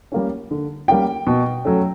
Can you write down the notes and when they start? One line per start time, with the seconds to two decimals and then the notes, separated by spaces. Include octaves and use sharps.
0.12 G3 A#3 C#4
0.51 D3
0.88 G3 A#3 C#4 G5
1.27 B2
1.65 F#3 A3 C#4